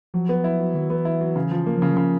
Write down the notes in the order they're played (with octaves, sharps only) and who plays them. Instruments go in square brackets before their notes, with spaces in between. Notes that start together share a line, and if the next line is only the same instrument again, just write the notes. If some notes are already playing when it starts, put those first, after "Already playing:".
[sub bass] F3 [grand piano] F#3
[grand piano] B3
E4
F#3
[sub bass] D#3 [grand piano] F#3
[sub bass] E3 [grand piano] B3
[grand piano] E4
F#3
C#3
F3
[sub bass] F3 [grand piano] A#3
[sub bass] F3
[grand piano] C#3
[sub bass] E3
F#3
[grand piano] C#3 [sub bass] F3